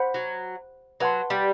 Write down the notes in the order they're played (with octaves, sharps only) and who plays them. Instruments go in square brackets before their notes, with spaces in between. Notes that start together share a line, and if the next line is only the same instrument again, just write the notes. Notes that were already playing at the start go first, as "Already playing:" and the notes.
Already playing: [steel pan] C5 F#5 B5
[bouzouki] F#3
[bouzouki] F#3 [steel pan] B4 F#5 A5 C6
[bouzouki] G3